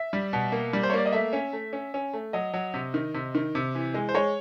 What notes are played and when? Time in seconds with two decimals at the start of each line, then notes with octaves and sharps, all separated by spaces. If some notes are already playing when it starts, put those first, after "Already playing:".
Already playing: E5
0.13 G3
0.33 B2
0.52 A#3
0.73 G3
0.83 C5
0.90 C#5
0.93 A#3 D5
1.06 D#5
1.12 A3 E5
1.33 C#4
1.53 A3
1.73 C#4
1.94 C#4
2.13 A3
2.33 F#3 D#5
2.54 F#3
2.74 C3
2.94 D#3
3.14 C3
3.35 D#3
3.55 C3
3.75 E3
3.94 G#3
4.09 C5
4.14 G#3 C#5